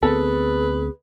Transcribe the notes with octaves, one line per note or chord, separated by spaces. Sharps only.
D2 B3 C4 G#4 A4 B4